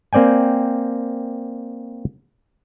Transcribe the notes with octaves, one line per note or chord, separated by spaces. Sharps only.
A#3 C4 D5 G5 G#5